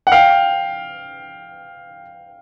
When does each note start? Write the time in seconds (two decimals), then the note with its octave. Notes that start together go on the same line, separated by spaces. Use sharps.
0.07 F#5
0.12 F5 G5